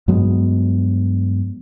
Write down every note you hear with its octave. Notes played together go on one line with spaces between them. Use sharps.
G2 F#3 G#3 B3